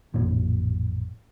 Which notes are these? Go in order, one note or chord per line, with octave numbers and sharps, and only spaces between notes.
A1 F2 A#2 D#3